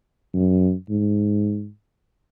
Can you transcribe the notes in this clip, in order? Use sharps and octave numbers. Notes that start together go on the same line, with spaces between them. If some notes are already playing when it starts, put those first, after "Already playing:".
F#2
G#2